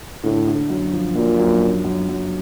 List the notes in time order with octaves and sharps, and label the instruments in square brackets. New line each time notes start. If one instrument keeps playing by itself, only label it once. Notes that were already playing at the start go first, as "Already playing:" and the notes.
[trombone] A2 [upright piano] D3
[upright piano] D3
F#2
F3
[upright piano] F#2 [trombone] A#2
[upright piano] F#2
F#2
F#2
F#2